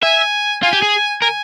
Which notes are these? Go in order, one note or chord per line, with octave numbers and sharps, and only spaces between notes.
E5 G#5
F4 G#5
G4
G#4
A#4 G#5